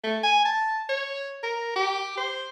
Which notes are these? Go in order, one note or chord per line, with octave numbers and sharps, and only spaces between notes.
A3
G#5
A5
C#5
A#4
G4
C5